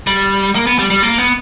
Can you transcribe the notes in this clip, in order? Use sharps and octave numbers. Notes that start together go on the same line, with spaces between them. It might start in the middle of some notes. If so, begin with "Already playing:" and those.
G3
A#3
B3
G3
G3
A#3
B3